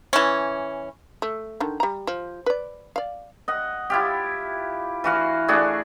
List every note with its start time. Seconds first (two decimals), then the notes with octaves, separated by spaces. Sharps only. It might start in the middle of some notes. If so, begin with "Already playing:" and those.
0.13 E3 C#4
1.22 A3
1.60 D3 D#3
1.80 G3 A#5
2.07 F3
2.46 B4 D5
2.96 D5 F5
3.48 D#5 F#5
3.90 E4 F4 G4
5.04 E3 F#4 F5
5.48 A3 D4 F#4 G#4